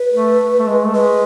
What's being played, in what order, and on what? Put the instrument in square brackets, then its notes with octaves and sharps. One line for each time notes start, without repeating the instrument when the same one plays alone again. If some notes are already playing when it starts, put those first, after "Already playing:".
Already playing: [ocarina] B4
[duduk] A3
A3
G#3
A3
[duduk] G#3 [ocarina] B4